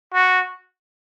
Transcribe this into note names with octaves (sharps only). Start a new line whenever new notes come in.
F#4